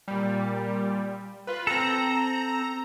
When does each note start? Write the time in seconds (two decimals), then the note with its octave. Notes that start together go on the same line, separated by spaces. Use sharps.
0.08 A#2 G3
1.47 F4 B4
1.67 C4 A4 A#5